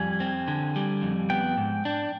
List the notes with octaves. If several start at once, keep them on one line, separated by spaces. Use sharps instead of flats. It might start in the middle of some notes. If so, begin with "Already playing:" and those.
Already playing: F2 G3 G#5
C4
D3
G3
F2
B3 G5
G#2
D4